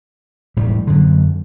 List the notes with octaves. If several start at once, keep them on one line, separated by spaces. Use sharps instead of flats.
E1 A2 G3
F#2 D3